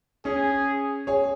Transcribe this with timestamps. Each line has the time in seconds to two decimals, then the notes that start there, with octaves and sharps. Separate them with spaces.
0.25 C#4 G#4
1.07 G#4 C#5